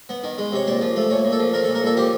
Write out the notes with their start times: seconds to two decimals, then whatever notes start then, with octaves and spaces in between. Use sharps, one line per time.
0.09 B3
0.23 D#3
0.38 G#3
0.52 C3 C#5
0.67 A#2 D5
0.81 F3
0.96 A3
1.10 A#2 C#5
1.25 A#2
1.32 A4
1.39 F3
1.53 A3 A#4
1.64 A4
1.68 A#2
1.75 A#4
1.83 A#2 A4
1.97 F3 G4